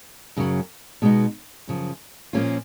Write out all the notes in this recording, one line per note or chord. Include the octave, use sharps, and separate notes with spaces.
F#2 C#3 F#3
B2 G#3 B3 D#4
F#2 C#3 F3
A#2 F3 A#3 C#4 F4